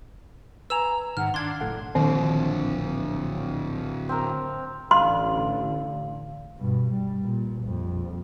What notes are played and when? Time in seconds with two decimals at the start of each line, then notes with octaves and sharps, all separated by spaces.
0.70 B4 G#5 A#5 E6 E7 F7
1.17 G#2 D#3 F#5 F6
1.34 D4 F5 C6 G#6
1.61 F#1 A2 A4 F#5
1.95 A#1 A2 D3 D#3 C4
4.09 C4 A#4
4.91 A1 D3 F5 C6
6.58 G2 B2
6.91 G3
7.23 A#2
7.63 A#1 F2